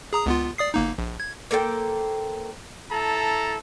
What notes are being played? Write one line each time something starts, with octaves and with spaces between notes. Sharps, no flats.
G#4 A#5 D#6
C#2 B3 F4
D5 D#6 C7
G1 A#3 D#4
A#1
G#6
A#3 A4 C5 G5
E4 A4 A5 A#5